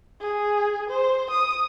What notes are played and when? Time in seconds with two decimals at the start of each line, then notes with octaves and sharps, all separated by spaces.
0.21 G#4
0.90 C5
1.30 D#6